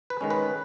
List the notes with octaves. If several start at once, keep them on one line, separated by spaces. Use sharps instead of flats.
B4
D#3 G#3 C#4
B4